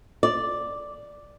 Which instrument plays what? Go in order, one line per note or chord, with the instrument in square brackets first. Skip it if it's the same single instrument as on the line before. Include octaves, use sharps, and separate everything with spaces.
[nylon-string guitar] D5